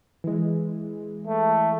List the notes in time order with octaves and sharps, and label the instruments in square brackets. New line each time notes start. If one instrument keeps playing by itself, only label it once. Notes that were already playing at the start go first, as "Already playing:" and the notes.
[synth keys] E3 G#3
[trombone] A3